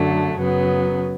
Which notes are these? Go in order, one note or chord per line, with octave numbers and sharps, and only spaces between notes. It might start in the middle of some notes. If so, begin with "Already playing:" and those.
Already playing: F#2 D3 F#3 A3
F#2 C#3 F#3 B3